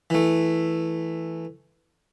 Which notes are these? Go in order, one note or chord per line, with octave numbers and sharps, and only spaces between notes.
E3 A3